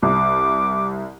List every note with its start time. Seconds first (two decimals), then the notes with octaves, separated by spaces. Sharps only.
0.03 C2 D6